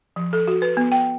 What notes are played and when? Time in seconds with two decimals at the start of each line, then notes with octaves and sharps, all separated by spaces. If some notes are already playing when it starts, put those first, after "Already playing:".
0.16 F3
0.33 A4
0.48 F#4
0.62 B4
0.77 B3
0.92 G5